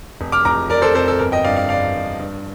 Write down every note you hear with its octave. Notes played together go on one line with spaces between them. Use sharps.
F1
D6 F6
F1 A#5 D6
F1 A#4 D5
A4 C5
F2 A4 C5
A4
G1 A#4
D#5 G5
G2 D5 F5
D5 F5
G1 D5 F5
G2
G2